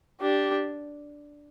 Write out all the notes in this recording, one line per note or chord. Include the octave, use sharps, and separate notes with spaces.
D4 G4